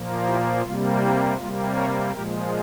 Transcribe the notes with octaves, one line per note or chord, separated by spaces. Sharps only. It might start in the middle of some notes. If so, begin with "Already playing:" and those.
Already playing: A#2 F3 A#3
E4 G4
C3 G3 A#3 F4
E4
C3 G3 A#3 F4
A#4 C#5
A#2 F3 G#3 G4 A#4